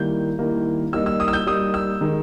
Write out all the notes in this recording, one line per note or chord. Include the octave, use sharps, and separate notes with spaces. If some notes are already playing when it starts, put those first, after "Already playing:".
Already playing: D#3 G3 A#3 E4 G6
D#3 G3 A#3 E4
G3 A#3 D#4 E6
E6
D#6
E6
G6
G3 A#3 D#4 D#6
E6
D#3 G#3 D#4